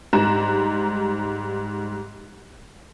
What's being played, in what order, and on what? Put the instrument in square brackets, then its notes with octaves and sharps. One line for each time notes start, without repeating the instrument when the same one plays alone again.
[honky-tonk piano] G#2 G3 A#5 F#6 E7